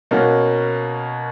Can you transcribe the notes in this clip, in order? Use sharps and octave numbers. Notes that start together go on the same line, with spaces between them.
B2 A#3 C#4 F#4 A#4